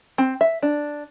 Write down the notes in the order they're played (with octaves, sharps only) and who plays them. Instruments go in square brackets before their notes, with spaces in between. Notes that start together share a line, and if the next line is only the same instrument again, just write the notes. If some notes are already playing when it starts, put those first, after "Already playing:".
[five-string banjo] C4
E5
D4